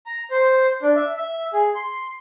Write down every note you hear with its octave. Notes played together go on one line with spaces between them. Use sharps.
A#5
C5
D4
E5
E5
G#4
C6